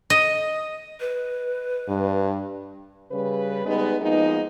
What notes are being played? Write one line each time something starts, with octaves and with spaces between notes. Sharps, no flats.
D#5
B4
G2
C#3 G3 B4
G3 G#3 B3 D#4 B4
F3 G#3 A#3 B3 D#4